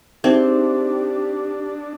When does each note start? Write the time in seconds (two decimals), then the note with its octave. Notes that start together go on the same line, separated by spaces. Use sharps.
0.24 C4 D4 D#4 G4 G#4 E5